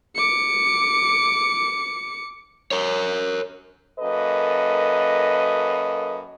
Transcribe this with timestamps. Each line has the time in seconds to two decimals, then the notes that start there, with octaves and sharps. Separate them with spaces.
0.16 D6 C#7
2.71 A#4 C#5
4.00 F#2 A#3 A4 B4 D#5